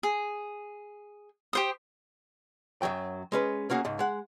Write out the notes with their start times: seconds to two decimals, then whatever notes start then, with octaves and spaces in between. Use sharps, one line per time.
0.03 G#4
1.53 G4 C5 D#6
2.82 F#2 C#3 F#3 G5
3.32 G#3 C#4 B4
3.70 A#3 C#4 F#4 G#4
3.85 C#2 G#2
3.99 G#3 F#5